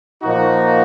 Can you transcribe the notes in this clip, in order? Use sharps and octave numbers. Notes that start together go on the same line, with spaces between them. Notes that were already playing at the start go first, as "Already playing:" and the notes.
A#2 F3 A#3 D#4 F#4